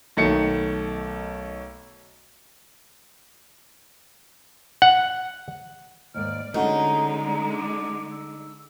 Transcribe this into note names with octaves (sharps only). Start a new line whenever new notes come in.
B1 D#3 A3 C#7
F#5
D#2 G#2 D#3 D5 F6
D3 G#3 A3 C#4 D#4 F#4 A#5
D6
E6